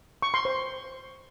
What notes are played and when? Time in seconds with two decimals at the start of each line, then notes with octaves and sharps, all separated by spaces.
0.22 C#6
0.34 C6
0.45 C5